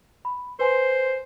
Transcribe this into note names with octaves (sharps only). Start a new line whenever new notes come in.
B5
B4 C5 G#5 C6